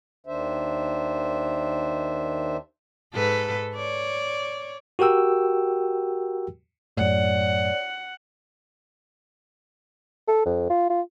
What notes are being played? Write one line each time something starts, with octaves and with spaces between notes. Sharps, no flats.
D#2 D#3 D4 C5 E5
G#2 A4 B4
C#5 D5
F#4 G4 A#4 G5 E6
F#2 A2 C#5 D5 F#5
A4
F2
F4
F4